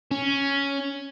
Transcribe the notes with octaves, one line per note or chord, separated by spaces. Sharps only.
C#4